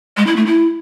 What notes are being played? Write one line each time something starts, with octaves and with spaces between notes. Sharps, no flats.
G#3
E4
A3
E4